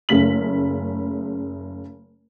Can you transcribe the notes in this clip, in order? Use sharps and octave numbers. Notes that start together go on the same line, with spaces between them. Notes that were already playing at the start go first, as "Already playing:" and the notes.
F#1 C#3 A3 B6 F#7